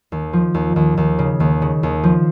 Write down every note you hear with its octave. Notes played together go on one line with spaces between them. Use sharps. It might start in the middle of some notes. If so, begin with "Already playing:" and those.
D#2
F3
D#2
D#2
D#2
C#3
D#2
C#3
D#2
F3